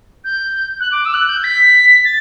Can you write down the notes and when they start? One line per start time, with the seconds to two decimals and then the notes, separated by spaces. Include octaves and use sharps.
0.24 G6
0.80 F#6
0.91 D6
1.05 E6
1.13 F#6
1.28 G6
1.43 B6
2.04 A6